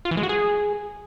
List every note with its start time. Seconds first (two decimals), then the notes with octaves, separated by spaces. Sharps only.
0.05 F4
0.11 E3
0.17 G#3
0.23 F#4
0.29 G#4